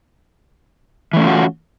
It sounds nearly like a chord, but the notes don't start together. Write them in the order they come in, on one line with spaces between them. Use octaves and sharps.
E3 A3 C#4 F4 F#4